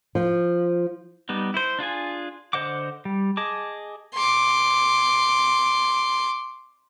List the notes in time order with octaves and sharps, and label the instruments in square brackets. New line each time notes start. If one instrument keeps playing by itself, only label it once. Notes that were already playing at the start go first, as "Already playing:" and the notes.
[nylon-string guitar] F3
[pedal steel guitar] G3 B3 D#4
E4 C5
D4 F4 G#4 G#5
D3 C5 D#5 F#5 D6
G3
G#4 D#5 A5 D6
[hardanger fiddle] C6 D6